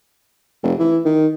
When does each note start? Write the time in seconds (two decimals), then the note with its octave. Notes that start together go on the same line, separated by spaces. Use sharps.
0.63 F1
0.79 E3
1.05 D#3